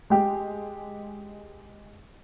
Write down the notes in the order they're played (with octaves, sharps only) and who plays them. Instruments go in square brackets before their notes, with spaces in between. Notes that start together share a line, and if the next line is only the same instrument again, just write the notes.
[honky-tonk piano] G#3 G4